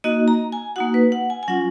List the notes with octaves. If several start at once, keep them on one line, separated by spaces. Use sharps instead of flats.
A#3 D#4 F#4 D#5
A#5
G#5
A#3 D#4 F#4 F#5
B4
F#5
G#5
G#5
F#3 C#4 F4 F#5